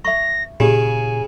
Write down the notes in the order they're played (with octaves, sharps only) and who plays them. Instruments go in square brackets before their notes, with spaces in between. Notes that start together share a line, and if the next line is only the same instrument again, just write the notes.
[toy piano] E5 C#6 [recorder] A#6
[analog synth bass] A#2 [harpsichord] C#3 [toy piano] G4 G#4 [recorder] G#5